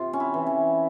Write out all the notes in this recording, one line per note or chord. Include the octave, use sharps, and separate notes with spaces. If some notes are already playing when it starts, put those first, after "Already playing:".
Already playing: C3 F4
C#4
E4
E3
C#4